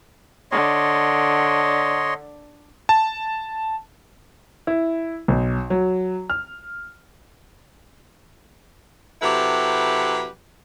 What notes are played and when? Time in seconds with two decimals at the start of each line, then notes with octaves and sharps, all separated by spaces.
0.52 D3 C#5 D#5 C6
2.89 A5
4.67 E4
5.28 B1
5.70 F#3
6.30 F6
9.22 C3 F#3 E4 G4 A4 B4